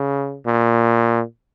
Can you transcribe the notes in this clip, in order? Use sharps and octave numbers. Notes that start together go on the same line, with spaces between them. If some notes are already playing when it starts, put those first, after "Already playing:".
Already playing: C#3
A#2